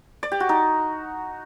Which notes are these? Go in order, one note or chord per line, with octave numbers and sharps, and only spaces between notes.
D5
G4
F#4
D#4